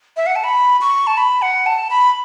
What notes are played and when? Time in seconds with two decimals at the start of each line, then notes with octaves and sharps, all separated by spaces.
0.17 E5
0.26 F#5
0.36 A5
0.44 B5
0.81 C#6
1.07 A5
1.17 B5
1.42 F#5
1.66 A5
1.90 B5